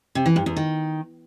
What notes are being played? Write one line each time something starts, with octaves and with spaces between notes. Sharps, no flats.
C3
E3
G2
E2
D#3